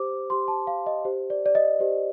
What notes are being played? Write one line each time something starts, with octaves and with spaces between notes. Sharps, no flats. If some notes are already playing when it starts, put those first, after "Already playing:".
Already playing: G4 C5 D6
G4 C5 C6
A5
F5
D#5
G4 C5
D5
D5
D#5
G4 C5